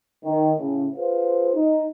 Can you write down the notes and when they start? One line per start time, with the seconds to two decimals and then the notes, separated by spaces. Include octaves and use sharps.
0.24 D#3
0.58 A2 C#3
0.95 F4 G#4 B4 C5 F5
1.55 D#4